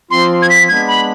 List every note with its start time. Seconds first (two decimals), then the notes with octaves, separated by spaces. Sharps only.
0.11 F3 C4 F4 C6
0.42 G#6
0.50 B6
0.68 G#3 B3 D4 G#6
0.88 B5